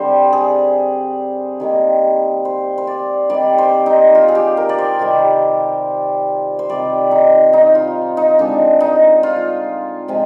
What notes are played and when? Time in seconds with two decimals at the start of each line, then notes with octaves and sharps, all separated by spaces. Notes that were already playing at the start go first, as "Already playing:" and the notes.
Already playing: D3 G3 C4 C5
0.33 G#4
1.60 D#3 G3 A#3
2.45 C5
2.78 C5
2.87 D5
3.30 D#3 G3 C4 D5
3.58 C5
3.86 D#4
4.15 F4
4.28 G#4
4.35 G4
4.57 A#4
4.69 D5
4.78 C5
4.99 C3 D#3 G3 C4
6.59 C5
6.69 C3 D#3 G3 D5
7.11 D#4
7.53 D#4
7.75 F4
8.17 D#4
8.39 D3 G#3 C4 D4
8.80 D#4
9.23 F4
10.08 C3 F3 G#3 C4